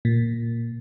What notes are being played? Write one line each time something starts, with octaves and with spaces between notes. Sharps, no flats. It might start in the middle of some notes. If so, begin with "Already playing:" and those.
A#2